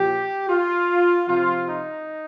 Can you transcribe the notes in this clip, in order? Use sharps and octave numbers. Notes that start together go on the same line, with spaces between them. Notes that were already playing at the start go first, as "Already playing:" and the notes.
Already playing: A#2 F3 G4
F4
C3 F3 F4
D#4